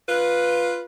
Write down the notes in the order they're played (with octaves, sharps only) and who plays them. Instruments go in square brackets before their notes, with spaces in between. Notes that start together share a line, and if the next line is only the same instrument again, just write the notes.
[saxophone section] F4 B4